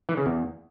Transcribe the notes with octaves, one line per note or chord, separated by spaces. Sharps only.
E3
C#3
E2